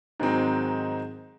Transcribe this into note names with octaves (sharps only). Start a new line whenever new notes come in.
G#2 D#3 F#3 G#3 C4 D#4